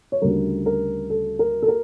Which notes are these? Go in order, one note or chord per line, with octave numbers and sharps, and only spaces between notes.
C#5
D2 C#3 G3 A#4
A#4
A4
A#4
A4
A#4